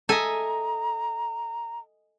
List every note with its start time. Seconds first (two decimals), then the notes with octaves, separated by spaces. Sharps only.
0.09 A4 D#5 E5 G#5 A#5